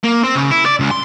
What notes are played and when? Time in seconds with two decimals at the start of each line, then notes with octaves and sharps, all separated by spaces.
0.04 A#3
0.24 C4
0.36 C#3
0.51 E4
0.66 D5
0.80 C#2
0.91 C6